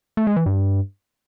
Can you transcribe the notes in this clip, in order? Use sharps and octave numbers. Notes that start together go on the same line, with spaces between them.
A3
G#3
E3
G2